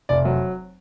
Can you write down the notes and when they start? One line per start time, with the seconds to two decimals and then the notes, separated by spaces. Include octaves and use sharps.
0.09 F1 D5
0.25 F#3